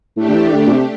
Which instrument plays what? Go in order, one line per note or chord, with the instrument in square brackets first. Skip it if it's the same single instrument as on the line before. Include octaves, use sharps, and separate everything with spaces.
[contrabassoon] A2 [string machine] A3 D4 G4
[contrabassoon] D3
E3
D3
A#2
C3